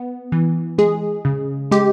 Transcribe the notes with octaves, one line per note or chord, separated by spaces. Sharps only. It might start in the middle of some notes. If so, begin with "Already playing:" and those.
Already playing: B3
E3
G#3 G#4
C#3
G#3 G4